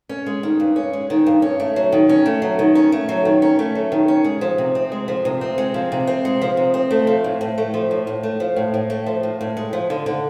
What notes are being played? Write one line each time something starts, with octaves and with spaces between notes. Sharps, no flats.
C#4
G#3
D#3
G2
C#4
G#3
D#3
G2
C#4
A3
F#3
D#3
C#4
A3
F#3
D#3
C#4
A3
F#3
D#3
C#4
A3
F#3
D#3
C#4
G#3
F3
C3
C4
G#3
F3
C3
C4
G#3
F3
C3
C4
G#3
F3
C3
C4
A3
F3
A2
A2
A3
F3
A2
A2
A3
F3
A2
A2
A3
F3
A2
A2
G#3
F3
D3
D3